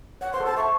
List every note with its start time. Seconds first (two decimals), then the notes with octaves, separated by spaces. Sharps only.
0.21 C#5 F#5
0.33 C5 C6
0.40 A4
0.45 C5 A5
0.57 E5 C#6